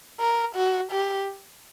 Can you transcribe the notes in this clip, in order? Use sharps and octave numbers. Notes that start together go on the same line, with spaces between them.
A#4
F#4
G4